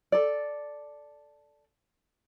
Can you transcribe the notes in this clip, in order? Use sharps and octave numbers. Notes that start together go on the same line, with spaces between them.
A4 D5